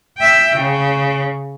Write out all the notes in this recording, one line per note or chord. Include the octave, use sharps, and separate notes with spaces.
E5 G5
C#3